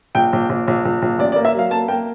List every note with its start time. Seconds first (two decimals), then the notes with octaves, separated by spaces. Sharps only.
0.15 A#1 G5
0.33 A#1
0.49 A#1
0.67 A#1
0.85 A#1
1.02 A#1
1.18 A1 D5
1.32 D5
1.36 A#3
1.45 E5
1.54 F#3 F5
1.71 A#3 A5
1.88 A#3 G5